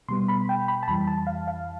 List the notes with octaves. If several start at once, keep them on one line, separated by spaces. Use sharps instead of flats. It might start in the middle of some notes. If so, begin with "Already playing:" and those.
B2 G3 B3 C6
B5
G5
B5
A5
F2 E3 G3 B5
A5
F5
F5